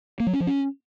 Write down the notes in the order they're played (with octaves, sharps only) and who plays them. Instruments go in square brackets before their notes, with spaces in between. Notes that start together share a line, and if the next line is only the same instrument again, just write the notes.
[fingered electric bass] A#3
F#3
C#4
F3
C#4